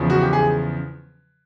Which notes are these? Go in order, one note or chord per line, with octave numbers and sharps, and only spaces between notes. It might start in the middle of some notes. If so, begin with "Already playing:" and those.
Already playing: E2 C#3 F3
F#4
G4
G#4